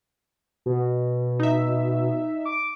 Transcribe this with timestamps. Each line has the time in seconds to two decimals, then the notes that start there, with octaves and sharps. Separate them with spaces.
0.66 B2
1.40 D#4 E5
2.45 D6